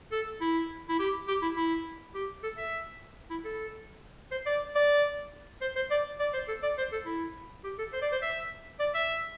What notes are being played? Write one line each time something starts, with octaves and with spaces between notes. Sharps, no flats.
A4
E4
E4
G4
G4
E4
E4
G4
A4
E5
E4
A4
C5
D5
D5
C5
C5
D5
D5
C5
A4
D5
C5
A4
E4
G4
A4
C5
D5
C5
E5
D5
E5